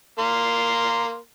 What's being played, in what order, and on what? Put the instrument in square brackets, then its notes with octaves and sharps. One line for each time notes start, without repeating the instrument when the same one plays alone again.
[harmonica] A#3 A#4 C6